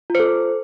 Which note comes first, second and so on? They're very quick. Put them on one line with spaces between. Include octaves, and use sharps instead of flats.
F4 C5 A4